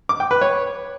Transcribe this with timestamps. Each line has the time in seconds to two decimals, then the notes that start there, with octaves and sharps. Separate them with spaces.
0.09 D6
0.20 G5
0.31 B4
0.41 C#5